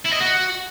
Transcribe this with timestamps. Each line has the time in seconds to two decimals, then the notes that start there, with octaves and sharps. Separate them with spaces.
0.06 E4
0.13 D#5
0.21 F#4